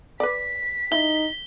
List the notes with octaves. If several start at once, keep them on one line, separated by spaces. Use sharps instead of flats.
B4 D5 B6
D#4 E4 G7